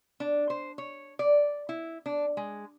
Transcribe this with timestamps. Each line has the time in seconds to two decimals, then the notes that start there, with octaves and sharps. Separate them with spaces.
0.20 D4
0.50 C5
0.78 C#5
1.19 D5
1.69 E4
2.06 D4
2.37 G#3